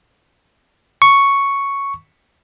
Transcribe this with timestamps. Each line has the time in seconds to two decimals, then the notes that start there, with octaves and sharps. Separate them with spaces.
1.02 C#6